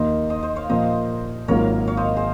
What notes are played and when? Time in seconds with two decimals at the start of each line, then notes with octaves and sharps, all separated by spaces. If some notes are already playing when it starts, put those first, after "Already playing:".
Already playing: D#2 D#3 A#3 A#4 C5 D#5
0.30 C5 D#5
0.43 C5 D#5
0.56 C#5 F5
0.70 A#2 F3 A#3 C5 D#5
1.48 G#1 G#2 F#3 A#3 F4 A#4 C#5
1.87 C#5 F5
1.97 C5 D#5
2.17 G#4 C5